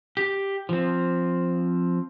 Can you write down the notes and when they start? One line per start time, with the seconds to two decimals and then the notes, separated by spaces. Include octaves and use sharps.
0.17 G4
0.69 F3 C4